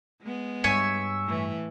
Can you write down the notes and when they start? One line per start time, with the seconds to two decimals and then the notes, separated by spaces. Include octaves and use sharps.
0.22 G#3 B3
0.64 G2 C#5 E5 G#5
1.24 A2 E3